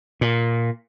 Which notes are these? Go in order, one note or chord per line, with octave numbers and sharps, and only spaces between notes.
A#2